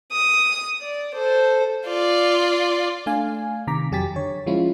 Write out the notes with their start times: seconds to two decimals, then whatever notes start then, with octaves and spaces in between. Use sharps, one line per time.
0.11 D#6
0.81 D5
1.14 A4 C5
1.87 F4 D5
3.06 A3 D4 F5 G#5
3.67 C3 D#3 A#5 D6 B6
3.92 F2 F#3 G4 G#5 A6 B6
4.16 D3 C#5
4.46 F3 G#3 C#4 E4 F4